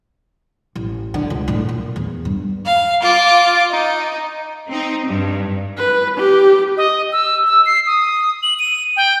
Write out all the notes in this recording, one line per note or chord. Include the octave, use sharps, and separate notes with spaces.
A1
D3
C#2
A2
A#2
E2
G2
F5
F4 D6
D#4
C4 D#4
G2
B4
G4
D#5
E6
E6
C7
D#6
F#7
D#7
G5